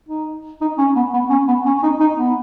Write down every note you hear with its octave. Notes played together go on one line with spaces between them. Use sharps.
D#4
D#4
C#4
B3
B3
C#4
B3
C#4
C#4
D#4
D#4
B3